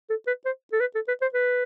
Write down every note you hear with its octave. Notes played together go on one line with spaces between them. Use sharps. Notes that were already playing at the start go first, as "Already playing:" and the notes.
A4
B4
C5
A4
B4
A4
B4
C5
B4